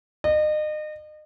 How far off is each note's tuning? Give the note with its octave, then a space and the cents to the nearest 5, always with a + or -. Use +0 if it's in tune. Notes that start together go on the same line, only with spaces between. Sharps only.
D#5 -35